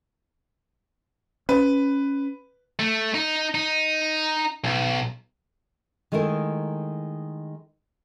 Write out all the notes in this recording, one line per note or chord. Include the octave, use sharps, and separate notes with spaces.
C#4 B4
A3
D#4
D#4
B1
D#3 G#3 A3 E4 A#4